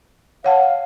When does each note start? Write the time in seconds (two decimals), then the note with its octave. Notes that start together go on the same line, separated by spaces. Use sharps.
0.44 C#5 F5 F#5 A5